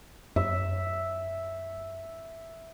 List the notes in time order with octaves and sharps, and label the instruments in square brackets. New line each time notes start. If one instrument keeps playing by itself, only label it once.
[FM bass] F#2 [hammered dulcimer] E5